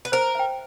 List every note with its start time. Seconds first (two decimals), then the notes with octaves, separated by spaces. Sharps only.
0.05 B4
0.12 A#4 C5
0.35 E5 G5